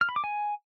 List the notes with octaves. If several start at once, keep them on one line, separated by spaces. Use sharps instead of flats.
F6
B5
D6
G#5